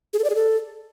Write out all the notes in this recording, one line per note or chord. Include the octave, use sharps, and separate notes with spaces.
G#4
A4
D5
G#4
A4